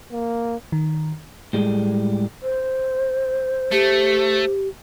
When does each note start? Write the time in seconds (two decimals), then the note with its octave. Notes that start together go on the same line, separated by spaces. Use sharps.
0.12 A#3
0.72 D#3
1.53 A2 G3 G#3
2.42 C5
3.72 A3 G4